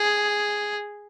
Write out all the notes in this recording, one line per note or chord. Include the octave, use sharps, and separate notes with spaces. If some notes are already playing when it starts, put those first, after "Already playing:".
Already playing: G#4